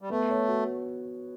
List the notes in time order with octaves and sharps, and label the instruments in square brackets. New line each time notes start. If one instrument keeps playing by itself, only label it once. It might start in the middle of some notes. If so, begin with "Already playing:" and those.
[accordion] G3
[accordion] A3 [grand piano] B3
[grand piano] C#5
F#4